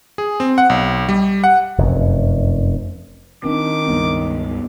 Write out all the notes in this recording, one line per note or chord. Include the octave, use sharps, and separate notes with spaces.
G#4
C4
F#5
B1
G3
F#5
F1 F#2
D#3 C4 D4 D6
C#2 G2 B3